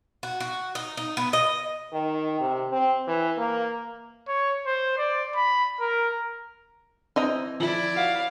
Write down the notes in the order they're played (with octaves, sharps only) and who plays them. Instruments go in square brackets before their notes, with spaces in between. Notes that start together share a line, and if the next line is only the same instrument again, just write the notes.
[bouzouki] F#4
F#4
D#4
D#4
B3
D#5
[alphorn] D#3
C3
C4
E3
A#3
[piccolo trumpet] C#5
C5
D5
B5
A#4
[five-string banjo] E3 D#5 A#5 [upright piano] C4
[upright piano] F3 F#7 [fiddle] E4 D5
[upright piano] F#4 [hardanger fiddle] F5